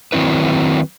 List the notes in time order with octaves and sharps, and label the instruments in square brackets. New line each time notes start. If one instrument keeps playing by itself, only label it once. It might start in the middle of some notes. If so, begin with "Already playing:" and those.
[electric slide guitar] D#3 F#3 C4 E4 B4